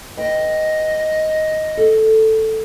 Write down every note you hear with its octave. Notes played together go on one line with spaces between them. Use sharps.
B4 D#5 G5
A4